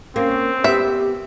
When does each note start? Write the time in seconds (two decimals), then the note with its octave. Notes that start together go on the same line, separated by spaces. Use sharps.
0.16 A#3 C4 C#4
0.64 B3 G4 E5